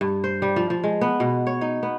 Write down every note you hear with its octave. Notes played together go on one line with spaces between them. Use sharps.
G2
C5
G3
F3
F3
G#3
B3
B2
C#5
D#4
B3